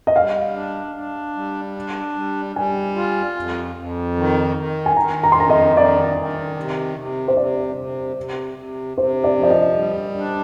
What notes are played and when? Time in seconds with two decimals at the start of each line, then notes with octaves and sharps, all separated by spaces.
0.07 D#5
0.16 G3 F5
0.55 D4
0.95 D4
1.35 G3
1.76 D4
2.16 G3
2.56 G3 G#5
2.96 F4
3.36 F2
3.75 F2
4.16 D#3
4.57 D#3
4.86 G#5
4.96 D#3 A#5
5.23 A#5
5.32 C6
5.36 F2 A#5
5.50 D#5
5.77 D#3 D5
6.17 D#3
6.57 C3
6.97 C3
7.28 C5
7.37 C3 D5
7.76 C3
8.16 C3
8.58 C3
8.97 C3 C5
9.24 D5
9.37 F3
9.43 D5
9.50 D#5
9.77 G3
10.18 D4